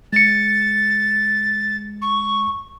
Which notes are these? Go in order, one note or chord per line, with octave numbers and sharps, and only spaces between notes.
G#3 A6 C#7
C#6